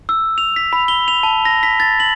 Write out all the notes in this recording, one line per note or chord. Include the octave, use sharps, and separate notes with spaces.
E6
F7
B6
B5
G7
F7
A5
A#6
B6
A6
F#7